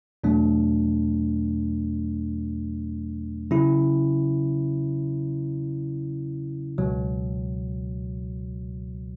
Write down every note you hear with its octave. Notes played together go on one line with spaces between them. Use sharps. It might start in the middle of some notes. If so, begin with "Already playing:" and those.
E2 B2 F#3 A3 D4
C#3 F#3 C#4 E4
C#2 B2 F#3